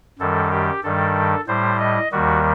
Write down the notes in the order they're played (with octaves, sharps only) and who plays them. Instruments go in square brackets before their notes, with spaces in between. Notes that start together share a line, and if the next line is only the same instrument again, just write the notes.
[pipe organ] F#2 D#3 G3 A4
G4
G2 D#3 G3 A4
A2 G3 C5
D#5
D#2 D#3 G3 F#4